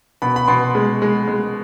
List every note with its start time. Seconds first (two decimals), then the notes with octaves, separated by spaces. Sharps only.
0.22 B2 B5
0.36 B5
0.48 B2 C6
0.75 G#3
1.02 G#3
1.28 G#3